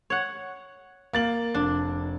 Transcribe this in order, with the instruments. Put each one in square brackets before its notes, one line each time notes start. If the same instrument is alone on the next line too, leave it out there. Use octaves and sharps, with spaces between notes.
[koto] C#5 F#5
[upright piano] A#3 A6 F#7
[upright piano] F1 [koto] D4